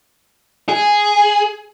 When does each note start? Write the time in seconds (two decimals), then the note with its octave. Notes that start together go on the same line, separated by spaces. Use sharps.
0.69 G#4